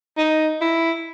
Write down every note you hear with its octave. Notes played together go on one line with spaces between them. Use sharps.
D#4
E4